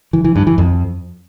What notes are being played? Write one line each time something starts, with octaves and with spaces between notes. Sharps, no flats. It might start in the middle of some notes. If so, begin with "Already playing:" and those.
E3
E3
G2
E3
F2